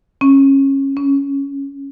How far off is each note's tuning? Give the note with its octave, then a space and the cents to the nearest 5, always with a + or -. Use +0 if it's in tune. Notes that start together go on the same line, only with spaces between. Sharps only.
C#4 -20
C#4 +5